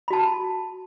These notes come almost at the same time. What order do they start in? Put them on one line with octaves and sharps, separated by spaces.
B5 F#4 A5